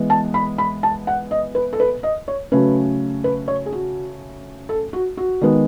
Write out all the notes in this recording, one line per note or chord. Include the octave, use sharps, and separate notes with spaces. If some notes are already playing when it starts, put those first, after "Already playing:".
Already playing: E3 G#3 B3
A5
B5
B5
A5
F#5
D#5
B4
A4
B4
D#5
C#5
C#3 F#3 A3 C#4 B4
B4
C#5
G#4
F#4
A4
F#4
F#4
D#3 G#3 B3